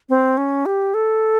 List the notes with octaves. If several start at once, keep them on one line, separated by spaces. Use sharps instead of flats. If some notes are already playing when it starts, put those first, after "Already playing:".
C4
C#4
G4
A4